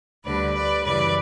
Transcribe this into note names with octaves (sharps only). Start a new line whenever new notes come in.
D2 D3 G3 B4 D5
B4 D5
F#2 C#3 E3 G3 B4 D5